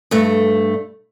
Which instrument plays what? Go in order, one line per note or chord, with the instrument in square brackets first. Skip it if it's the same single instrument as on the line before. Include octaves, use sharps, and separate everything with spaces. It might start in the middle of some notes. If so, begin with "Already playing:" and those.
[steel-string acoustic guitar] G2 A3